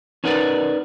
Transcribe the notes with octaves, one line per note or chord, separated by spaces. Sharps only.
C#4 D#4 F#4 A#4 B4 D5